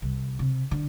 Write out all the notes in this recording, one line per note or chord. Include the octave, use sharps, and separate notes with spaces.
C2
C3
D3